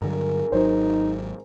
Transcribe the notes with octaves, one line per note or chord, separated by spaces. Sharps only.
G2 D3 F#3 G#4 A#4
G#1 F#3 D#4 C5